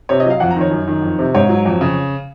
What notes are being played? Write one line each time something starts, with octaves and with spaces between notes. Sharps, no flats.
C3 C#5
D#5
F#3 F5
F2 F#5
A#5
D#3 C#5
F#2
D#3
F2
C3
G#2 C#5
F#3
F2
C#3